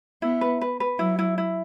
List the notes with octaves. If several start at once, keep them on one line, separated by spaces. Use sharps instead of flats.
B3 E4
B4
B4
B4
F#3 E4
E4
E4